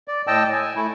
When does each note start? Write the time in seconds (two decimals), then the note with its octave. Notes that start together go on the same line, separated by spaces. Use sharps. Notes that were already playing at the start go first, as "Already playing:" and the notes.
0.08 D5
0.27 A2 D#5 G5 A5 E6
0.52 G#5
0.76 A3 E4